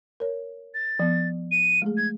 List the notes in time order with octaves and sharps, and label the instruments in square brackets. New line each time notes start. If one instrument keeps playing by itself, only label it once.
[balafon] A#4 C#5
[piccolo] A6
[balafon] F3 B3
[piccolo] D#7
[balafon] G#3 A3 G#4
[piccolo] G#6